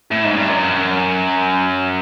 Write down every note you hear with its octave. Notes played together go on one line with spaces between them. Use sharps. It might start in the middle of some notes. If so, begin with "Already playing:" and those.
A2
G#2
G2
F#2